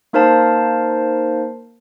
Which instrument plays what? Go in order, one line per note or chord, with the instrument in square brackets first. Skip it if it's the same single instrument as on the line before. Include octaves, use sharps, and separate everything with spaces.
[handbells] A#3 D#4 A#4 C5 F5 A5